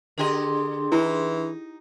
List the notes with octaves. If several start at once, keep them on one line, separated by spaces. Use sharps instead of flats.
D3 D4 G4 G#4 D#5 C6
E3 D#4 E4